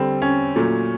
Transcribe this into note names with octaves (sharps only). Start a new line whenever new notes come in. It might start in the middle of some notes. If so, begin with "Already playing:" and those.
Already playing: D3 G3 C4
C#4
A#2 F#3 A3